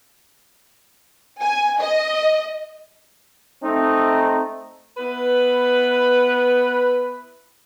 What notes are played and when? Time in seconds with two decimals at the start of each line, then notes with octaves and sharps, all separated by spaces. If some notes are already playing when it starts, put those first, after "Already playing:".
1.41 G#5
1.80 D#5
3.63 A3 C4 D#4
4.98 B3 E4 B4